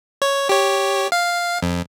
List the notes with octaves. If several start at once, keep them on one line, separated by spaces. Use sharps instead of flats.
C#5
G4 C#5
F5
F2